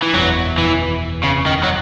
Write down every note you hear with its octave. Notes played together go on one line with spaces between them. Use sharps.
E3
F#1 E2 B2 F#3
E3
C#3
D#3
F#3